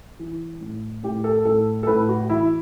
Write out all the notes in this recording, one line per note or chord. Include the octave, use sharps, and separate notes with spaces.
E3
A2
A2 G4
A4
A2 A4
A4
A2 B4
F#4
E3 E4